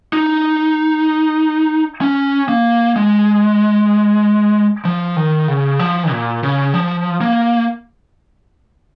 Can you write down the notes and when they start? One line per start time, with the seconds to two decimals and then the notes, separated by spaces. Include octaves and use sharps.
0.13 D#4
2.01 C#4
2.49 A#3
2.96 G#3
4.85 F3
5.16 D#3
5.48 C#3
5.79 F3
6.11 A#2
6.43 C#3
6.74 F3
7.21 A#3